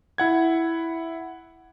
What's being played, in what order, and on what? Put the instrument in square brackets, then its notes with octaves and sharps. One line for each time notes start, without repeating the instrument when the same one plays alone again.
[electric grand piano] E4 F#5 G#6